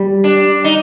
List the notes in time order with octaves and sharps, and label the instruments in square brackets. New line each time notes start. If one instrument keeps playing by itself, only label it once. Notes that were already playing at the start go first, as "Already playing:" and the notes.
Already playing: [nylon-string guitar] G3
[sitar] D4
D#4